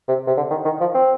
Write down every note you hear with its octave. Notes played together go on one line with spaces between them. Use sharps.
C3
C3
D3
D#3
D#3
F3
C4